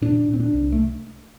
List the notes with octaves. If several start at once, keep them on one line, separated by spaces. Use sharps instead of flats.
A#2 D4
A#2 C4
D4
C2
A3